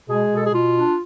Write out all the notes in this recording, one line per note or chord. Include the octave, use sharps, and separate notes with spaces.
B2 G#3 G#4
B2 A4
G#4
B2 F4
D4